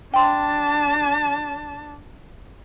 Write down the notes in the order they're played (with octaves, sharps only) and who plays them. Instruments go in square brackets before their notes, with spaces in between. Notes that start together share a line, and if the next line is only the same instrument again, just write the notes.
[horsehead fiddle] D4 A5 [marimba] G5 C6